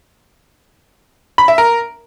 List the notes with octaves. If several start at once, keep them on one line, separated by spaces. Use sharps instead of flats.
B5
E5
A#4